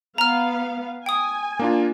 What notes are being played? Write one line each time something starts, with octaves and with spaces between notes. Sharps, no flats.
B3 F5 A#5 F6
G5 G#5 D#6
A#3 D4 F4